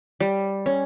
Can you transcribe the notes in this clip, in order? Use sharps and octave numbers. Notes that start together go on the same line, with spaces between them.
G3
C#4